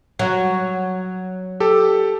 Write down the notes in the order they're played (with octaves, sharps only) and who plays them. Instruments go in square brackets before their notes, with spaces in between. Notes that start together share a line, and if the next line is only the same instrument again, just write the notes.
[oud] F#3
[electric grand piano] G4 A4